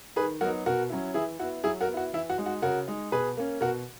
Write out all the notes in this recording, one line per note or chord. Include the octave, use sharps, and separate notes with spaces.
D#3 G#4 B4
F#3 B3 D#4 F#4 A#4
B2 F#4 A#4
F#3 C#4 E4
E3 E4 G#4
B3 E4 F#4
F#3 E4 G#4
F#4 A#4
B3
E4 F#4
E3 E4
F#4
G#3 D#4
F#4
C#3 F#4 A#4
G#3 D#4
B2 G#4 B4
A#3 C#4
B2 F#4 A#4